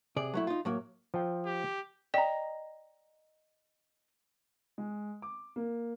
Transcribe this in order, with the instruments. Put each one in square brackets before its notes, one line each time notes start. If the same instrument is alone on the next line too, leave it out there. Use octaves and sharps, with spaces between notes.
[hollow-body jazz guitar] C3 G#4 D5
F#3 A3 E4
D#4 F4
A2 F#3 A#3
[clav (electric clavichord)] F3 G5
[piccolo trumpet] G4
[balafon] D5 G5 [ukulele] D#5 A#5
[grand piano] G#3
D6
A#3